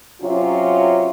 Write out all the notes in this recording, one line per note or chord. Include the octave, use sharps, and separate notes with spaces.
C3 F#3 C#4 F4